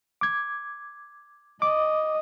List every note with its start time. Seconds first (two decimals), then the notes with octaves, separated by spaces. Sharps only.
0.21 D6 G#6
1.62 D#5 D6